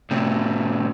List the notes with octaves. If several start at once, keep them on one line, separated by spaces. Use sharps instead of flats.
A2 C3